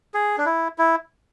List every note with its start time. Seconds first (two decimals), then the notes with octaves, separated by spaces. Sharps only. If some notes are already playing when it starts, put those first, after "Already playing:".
0.14 G#4
0.38 D4
0.46 E4
0.78 E4